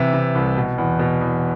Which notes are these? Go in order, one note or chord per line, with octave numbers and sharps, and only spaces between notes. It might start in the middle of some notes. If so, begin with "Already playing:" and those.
Already playing: C3 E3 E5
C3
C2
B2
E2
B2
E2